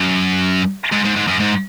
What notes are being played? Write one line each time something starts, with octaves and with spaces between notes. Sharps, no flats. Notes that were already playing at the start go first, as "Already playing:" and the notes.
Already playing: F#2
G#2
G#2
G#2
F#2
G#2